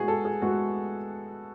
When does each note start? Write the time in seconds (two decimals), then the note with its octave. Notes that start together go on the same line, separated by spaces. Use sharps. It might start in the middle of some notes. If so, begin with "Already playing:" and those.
Already playing: A2 G#3 B3 F#4 G#4
0.08 A4
0.25 G#4
0.42 A2 G#3 B3 F#4